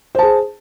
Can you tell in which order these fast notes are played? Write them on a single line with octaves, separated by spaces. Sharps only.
C5 A5 G#4